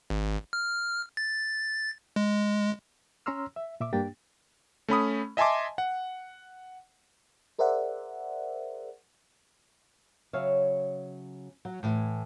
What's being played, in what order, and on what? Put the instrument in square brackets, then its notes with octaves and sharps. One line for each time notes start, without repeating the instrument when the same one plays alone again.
[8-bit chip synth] G#1
F6
A6
G#3
[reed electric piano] C#4 C#5 A#5 C6 E6 F6
E5
A#2 E5 D6
G2 A#3 D4 G4 G5 A6
[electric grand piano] A3 C#4 B5 D#6
D#5 E5 G#5 A5 C6 D6
F#5
[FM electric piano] G#4 A#4 C5 D5 E5 F#5
[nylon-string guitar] C#3 F#3 C#5 E5 F5
F#3
A2 E3